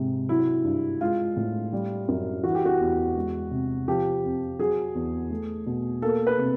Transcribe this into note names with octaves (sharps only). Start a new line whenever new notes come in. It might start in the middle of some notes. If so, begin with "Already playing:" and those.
Already playing: G#2 C3 G#3
F#3 E4
G2
G#3 F4
A2
G3
F#2
E3 F#4
G4
F#4
E2
G#3
C3
F3 G4
F2
F#3 G#4
E2
A3
B2
A#3 A4
B4
C3